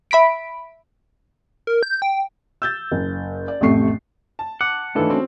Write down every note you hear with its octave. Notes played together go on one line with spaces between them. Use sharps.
E5 B5 B6 D7
A#4
G6
G5
E6 G6 A6
F#1
D5
A1 F2 C3 A3 C#6 C7
A5
F#5 D6
G#2 E3 A3 D4 E4 F4 A4 B4
C4 C#4 F#4 C5